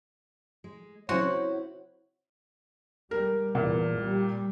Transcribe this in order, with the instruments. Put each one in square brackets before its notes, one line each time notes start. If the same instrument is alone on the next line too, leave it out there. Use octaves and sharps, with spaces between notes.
[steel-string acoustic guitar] G#3
[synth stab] C#3 F#3 C5 [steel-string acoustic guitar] C4 E4 [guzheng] F#4 [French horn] C#5
[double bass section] G3 [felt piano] A#4
[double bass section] E2 [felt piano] A#2
[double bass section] G3